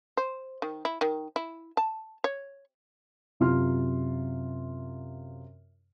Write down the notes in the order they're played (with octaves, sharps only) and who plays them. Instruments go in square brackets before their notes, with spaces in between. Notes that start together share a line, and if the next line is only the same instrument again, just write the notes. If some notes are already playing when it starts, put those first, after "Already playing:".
[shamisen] C5
D#3
E4
D#3
E4
A5
C#5
[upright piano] F#2 C3 F4 C6 F6